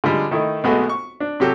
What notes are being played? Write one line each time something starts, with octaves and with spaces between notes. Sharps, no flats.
D3 F3 G3 G#3
D#3 A3 D#4 E4
B1 G#3 A3 B3 F#4
C#6
D4
C3 F#3 G4 A4